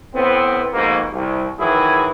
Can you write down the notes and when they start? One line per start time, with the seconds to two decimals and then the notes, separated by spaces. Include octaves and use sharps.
0.14 A2 B3 C4
0.73 F2 G#2 B2 A#3
1.13 C2
1.59 D#3 E3 F#3 E4 G#4